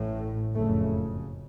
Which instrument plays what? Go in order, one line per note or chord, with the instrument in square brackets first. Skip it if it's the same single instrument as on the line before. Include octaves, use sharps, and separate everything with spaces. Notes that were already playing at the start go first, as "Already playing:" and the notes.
Already playing: [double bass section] A1 A2
F#1 F2 C#3 A3